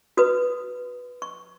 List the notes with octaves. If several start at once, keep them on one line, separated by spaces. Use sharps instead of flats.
F#4 B4 D#6
C#6